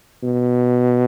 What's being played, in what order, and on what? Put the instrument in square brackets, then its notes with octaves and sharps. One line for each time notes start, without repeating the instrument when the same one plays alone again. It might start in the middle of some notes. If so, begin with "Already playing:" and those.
[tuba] B2